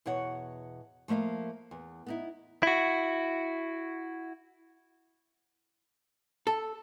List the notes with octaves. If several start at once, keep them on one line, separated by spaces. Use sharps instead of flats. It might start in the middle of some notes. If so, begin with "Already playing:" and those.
E2 B2 C#5 F#5
F3 A3 A#3 E5 F5
E2
B3 D#4 E4
E4 F#4
A4